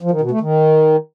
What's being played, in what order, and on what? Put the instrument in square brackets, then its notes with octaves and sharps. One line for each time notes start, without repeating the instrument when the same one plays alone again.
[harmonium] F3
D#3
B2
A3
D#3